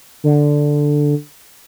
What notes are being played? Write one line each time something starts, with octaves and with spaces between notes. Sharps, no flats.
D3